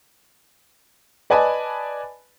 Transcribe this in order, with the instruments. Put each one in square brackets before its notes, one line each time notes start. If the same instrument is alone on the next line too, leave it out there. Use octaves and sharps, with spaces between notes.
[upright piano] B4 D5 D#5 G#5 A5 B5